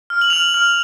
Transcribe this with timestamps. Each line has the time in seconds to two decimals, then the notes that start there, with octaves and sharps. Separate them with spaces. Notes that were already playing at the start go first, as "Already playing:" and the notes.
0.10 F6
0.21 F#7
0.30 F6 F7
0.38 F#7
0.54 F6